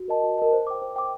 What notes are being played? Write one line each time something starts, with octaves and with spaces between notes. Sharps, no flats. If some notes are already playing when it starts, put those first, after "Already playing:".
Already playing: F#4
A#4 D#5 A5
F#4
A#4 D#5 A5
C5
G5 D6
C5
G5 D6